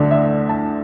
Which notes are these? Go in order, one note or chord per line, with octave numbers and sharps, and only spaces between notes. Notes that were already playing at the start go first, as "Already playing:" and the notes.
Already playing: D2 D3 A3 D4
E5
A5